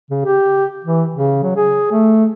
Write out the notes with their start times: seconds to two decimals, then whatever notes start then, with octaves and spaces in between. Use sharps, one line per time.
0.11 C#3
0.25 G4
0.85 E3
1.14 C#3
1.43 F#3
1.56 G#4
1.92 A3